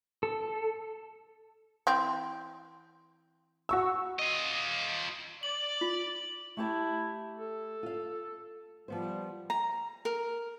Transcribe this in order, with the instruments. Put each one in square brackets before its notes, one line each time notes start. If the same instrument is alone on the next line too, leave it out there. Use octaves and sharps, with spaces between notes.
[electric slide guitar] A4
[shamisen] E3 C4
[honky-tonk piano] F#4 C#6 E6
[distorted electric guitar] F4 D#5
[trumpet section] D5 [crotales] F#7
[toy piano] F4
[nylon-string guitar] A3 G4 A5 [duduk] E4
[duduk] A4
[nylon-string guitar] F4 F5
[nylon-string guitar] F3 B3 C5 [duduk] G3
[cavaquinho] A#5
A#4